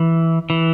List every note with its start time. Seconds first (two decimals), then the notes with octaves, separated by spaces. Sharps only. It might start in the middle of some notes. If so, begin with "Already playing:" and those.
Already playing: E3
0.50 E3